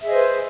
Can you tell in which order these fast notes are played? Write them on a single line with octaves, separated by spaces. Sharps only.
E5 G#4 D#5 C5 B4